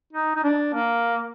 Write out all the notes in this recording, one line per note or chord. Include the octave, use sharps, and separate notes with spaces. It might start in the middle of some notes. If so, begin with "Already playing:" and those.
D#4
D#4
D4
A#3